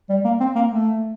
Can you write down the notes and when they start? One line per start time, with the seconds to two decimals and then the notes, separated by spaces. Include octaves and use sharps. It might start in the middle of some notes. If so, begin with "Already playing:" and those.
0.09 G3
0.24 A#3
0.40 C4
0.55 A#3
0.71 A3